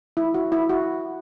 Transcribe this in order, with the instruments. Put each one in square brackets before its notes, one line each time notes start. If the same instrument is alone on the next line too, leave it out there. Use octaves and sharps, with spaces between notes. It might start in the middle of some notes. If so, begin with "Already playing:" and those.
[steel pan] E4
F#4
E4
F#4